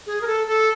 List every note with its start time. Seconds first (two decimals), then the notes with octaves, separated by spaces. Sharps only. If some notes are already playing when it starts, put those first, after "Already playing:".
0.06 G#4
0.21 A#4
0.27 A4
0.47 A4